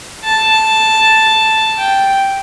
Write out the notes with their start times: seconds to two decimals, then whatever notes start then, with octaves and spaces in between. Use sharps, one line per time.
0.24 A5
1.78 G5